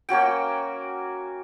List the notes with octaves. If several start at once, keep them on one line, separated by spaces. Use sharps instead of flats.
A#3 C#4 F#4 G5